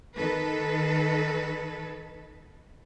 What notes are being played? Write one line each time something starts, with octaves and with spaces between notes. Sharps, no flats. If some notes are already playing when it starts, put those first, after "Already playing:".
D#3 A4 B4